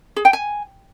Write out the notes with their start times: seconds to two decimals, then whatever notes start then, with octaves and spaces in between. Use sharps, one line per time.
0.16 G#4
0.25 G5
0.33 G#5